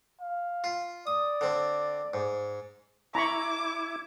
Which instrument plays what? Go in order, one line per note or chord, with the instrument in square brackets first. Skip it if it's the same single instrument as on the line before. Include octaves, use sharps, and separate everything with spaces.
[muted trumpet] F5
[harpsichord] F4
[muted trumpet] D5 [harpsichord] D#6
[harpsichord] D3 C4
G#2
[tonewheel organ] E4 [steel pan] A#5 B5 C#6 [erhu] D6